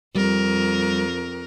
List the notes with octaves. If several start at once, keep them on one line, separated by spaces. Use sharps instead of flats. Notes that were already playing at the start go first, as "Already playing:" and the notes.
F2 G3 A#4